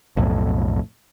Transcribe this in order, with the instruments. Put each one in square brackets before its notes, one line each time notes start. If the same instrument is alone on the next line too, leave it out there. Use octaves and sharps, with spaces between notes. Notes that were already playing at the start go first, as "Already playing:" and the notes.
[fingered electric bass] B1 F2 A2